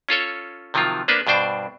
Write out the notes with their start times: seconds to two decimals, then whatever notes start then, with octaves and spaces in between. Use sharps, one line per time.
0.09 C#4 F4 A4 C#5
0.74 C3 D#3 F3 F#3 F4
1.08 A#3 B3 D4 B4 C5
1.27 G2 B2 D4 C5 G5